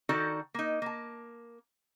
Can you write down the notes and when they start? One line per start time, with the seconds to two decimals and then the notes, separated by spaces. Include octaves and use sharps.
0.09 D#3 D#4 F#4 A4 D5
0.54 A#3 D#4
0.82 A#3 A5